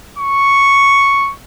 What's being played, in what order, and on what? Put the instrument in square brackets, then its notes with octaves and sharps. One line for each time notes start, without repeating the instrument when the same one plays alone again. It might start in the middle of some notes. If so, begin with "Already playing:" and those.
[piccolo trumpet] C#6